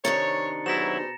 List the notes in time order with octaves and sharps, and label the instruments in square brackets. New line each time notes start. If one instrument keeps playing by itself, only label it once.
[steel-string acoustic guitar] C3 D#3 D4 [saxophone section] C#5 [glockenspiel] A#5 A6 C#7
[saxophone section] B2 G#4 C5 [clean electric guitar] F#3 E4 [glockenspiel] A#6 E7